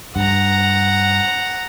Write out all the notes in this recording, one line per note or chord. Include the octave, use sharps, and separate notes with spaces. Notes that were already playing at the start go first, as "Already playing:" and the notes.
G2 F#5 A#5